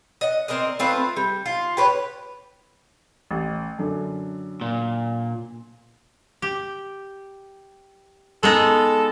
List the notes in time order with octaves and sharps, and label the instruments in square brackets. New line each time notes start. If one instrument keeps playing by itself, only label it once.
[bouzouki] D#5 F#5
C4 A#4 D5 D#5
A3 C4 F4 B4
G3
F4
G4 B4 C#5
[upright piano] A1
F#2 D3
[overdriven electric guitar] A#2
[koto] G4
[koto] G#3 B3 D#4 [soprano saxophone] A4